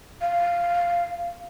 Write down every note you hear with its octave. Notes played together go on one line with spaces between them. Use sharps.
F5